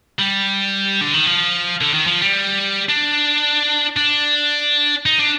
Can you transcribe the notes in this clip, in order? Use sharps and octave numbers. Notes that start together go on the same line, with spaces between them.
G3
D3
D#3
F3
D3
D#3
F3
G3
D4
D4
D#4
D4